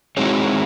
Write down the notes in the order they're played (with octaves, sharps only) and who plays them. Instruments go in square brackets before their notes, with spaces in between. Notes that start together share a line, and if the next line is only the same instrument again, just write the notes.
[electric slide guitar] G#3 C4 D#4 G#4 C#5 [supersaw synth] E4 F#4